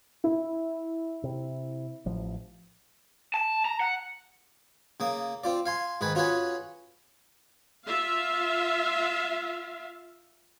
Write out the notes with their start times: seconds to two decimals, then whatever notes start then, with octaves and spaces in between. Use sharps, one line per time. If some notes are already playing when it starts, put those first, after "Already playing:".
0.24 E4
1.23 C3
2.06 A1 F3
3.34 A5
3.65 A#5
3.80 F#5
5.00 C#3 A#3 D#6
5.44 C4 F4 D5
5.66 F5 G#5 C6
6.01 G#2 D#3 B4 G#5
6.15 C#4 F4 F#4 G#4 B4 G#5
7.86 F4 E5 F5